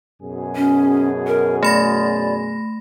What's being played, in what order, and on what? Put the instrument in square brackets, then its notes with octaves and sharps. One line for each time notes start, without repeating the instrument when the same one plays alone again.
[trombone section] F#2 B2 G#4
[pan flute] C#4
A#4
[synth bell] A3 B5 A#6 [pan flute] D5